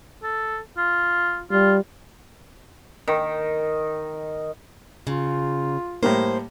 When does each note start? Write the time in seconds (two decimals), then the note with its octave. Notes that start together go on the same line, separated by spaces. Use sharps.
0.22 A4
0.77 F4
1.51 G3 F4
3.08 D#3
5.07 C#3 F4
6.03 A2 G3 A#3 C5